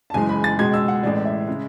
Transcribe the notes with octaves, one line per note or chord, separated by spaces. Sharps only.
A5
F#1 F#2 E3 G#3 G#5
B5
A6
C#2 B2 G#3 G#6
E6
F#5
A1 A2 E3 G#3 D5
E5
C#3 G#3